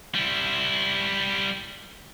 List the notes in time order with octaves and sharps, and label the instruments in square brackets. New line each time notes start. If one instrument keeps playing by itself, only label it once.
[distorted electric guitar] G3 E4